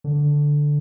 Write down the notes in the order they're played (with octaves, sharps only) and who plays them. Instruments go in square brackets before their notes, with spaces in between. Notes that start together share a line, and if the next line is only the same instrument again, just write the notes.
[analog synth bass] D3